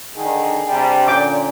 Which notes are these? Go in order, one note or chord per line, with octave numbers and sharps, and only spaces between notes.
D3 D#3 G#4
C3 G3 D4
A#2 D3 C#4 G5 D6